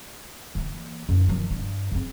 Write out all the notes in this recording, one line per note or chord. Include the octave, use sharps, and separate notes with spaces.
E3 A#3
F#2 D#4
D#3 F3
G2
C#3 C4